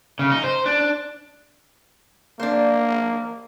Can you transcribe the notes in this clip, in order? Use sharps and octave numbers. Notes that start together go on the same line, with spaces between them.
C#3
D#4
C5
D4
A#3 D4 C5